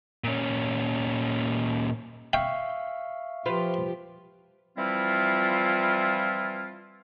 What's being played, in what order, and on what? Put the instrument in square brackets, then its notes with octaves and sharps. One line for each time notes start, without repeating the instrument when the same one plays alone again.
[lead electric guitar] A#2 C#4
[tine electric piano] E5 F5 C#6 [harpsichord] G5
[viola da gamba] F3 G4 [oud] F4 B4 C5
[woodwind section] E3 F3 G3 C4 E4 F4